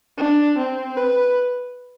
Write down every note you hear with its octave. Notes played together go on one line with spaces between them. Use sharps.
D4
C4
B4